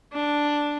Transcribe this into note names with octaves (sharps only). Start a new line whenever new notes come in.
D4